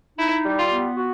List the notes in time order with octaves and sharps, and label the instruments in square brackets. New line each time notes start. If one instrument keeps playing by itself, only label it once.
[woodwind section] D#4 [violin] E4
[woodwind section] G3
[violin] F4
[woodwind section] B3
F#4